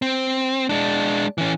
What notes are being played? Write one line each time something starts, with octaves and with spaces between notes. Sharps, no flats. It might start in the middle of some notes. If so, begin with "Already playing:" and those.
C4
G#3 D4
E3 C#4